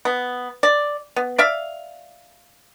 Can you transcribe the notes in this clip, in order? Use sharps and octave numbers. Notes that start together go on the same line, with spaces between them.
B3
D5
B3
D5 E5 F5